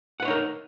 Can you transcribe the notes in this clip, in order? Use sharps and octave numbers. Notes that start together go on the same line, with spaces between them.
D#4 A#4 B4 C#5 F#5